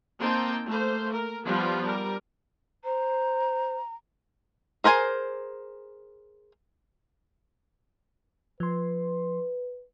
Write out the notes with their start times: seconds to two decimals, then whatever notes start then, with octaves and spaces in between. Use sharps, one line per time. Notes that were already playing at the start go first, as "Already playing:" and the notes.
0.20 A#3 C4 D#4 G5 A5 C6
0.67 A3 A#3 C5
1.12 A#4
1.44 F3 G3 B3 D4 F4
1.83 G3 A#4
2.85 C5 A#5
4.84 G#4 A#4 C5 G#5
8.60 F3 B4 C6